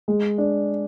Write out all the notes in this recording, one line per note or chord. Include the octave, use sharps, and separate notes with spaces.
G#3
D4